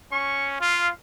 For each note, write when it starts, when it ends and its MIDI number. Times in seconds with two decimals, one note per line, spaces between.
0.12 0.56 61
0.12 0.46 85
0.61 0.90 65
0.61 0.89 77